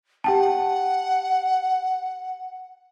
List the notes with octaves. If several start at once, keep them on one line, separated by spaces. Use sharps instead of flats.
G4 F#5 G5 A5